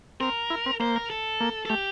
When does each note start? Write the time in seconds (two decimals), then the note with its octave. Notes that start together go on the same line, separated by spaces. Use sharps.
0.21 C4 A#4
0.50 E4
0.66 C4
0.80 A#3 C5
0.96 A#4
1.10 A4
1.40 A#3
1.66 A4
1.69 A3 G4